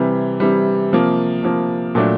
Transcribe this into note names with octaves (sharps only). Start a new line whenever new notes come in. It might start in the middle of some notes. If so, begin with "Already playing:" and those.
Already playing: C3 E3 G3
C3 E3 G3
C3 F3 A#3
C3 F3 A#3
A#2 F#3 A3 D4